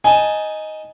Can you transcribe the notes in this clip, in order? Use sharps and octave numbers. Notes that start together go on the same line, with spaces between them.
D#4 G#5 A5